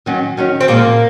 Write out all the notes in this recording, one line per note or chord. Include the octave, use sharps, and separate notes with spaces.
D#3 F#3 C#4
D#3 F#3 C#4
C4
A#2 F3 G#3 A#3